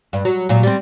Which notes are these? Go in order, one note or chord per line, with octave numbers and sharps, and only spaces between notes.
G2
F#3
A#2 F#3
G3 C4